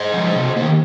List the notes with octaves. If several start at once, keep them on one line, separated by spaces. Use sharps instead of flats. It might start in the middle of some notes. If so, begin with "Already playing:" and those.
Already playing: C5 D#5
F3 G#3
C3
D#3 A#3